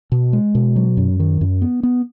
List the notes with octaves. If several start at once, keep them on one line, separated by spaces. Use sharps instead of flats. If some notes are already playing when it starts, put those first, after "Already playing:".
B2
G#3
B2
F#3
F#2
D#3
F#2
B3
B3